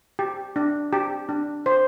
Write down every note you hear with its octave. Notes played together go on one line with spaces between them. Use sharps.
G4
D4
G4
D4
C5